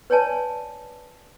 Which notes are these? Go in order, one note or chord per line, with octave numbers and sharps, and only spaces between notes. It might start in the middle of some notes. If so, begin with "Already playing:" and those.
B4 C#5 D5 G#5 A5